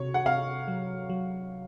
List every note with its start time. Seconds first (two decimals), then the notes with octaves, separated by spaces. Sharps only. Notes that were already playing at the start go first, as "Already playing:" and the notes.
Already playing: C3 F#4 C#5
0.14 F#5
0.26 C3 F5
0.68 F#3
1.10 F#3